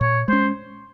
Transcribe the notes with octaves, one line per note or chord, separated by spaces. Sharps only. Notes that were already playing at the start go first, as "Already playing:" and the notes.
A#2 C#5
G#3 C#4 C5